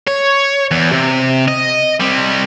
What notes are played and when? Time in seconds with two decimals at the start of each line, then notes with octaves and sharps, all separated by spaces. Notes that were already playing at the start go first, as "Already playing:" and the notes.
0.08 C#5
0.71 E2
0.92 C3
1.48 D#5
2.00 G3 C4